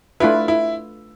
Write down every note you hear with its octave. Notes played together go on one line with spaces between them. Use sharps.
A3 D4 E4 F4 B4
E4